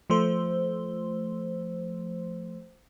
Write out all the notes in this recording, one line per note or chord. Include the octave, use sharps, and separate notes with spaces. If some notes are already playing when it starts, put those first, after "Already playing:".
F3 A3 C5